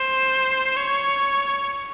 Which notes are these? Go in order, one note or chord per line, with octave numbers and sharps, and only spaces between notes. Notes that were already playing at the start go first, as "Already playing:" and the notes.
Already playing: C5
C#5